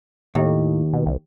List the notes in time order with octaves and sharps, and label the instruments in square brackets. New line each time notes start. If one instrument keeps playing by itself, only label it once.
[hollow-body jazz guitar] D#2 [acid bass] A2
[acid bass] B2
C2